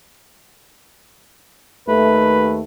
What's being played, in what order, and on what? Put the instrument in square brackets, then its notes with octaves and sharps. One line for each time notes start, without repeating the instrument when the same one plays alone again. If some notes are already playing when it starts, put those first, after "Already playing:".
[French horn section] D#2 A3 [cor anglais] B4